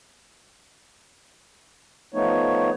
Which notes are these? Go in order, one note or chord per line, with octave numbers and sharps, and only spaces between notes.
F3 A3 B3 D#4 C#5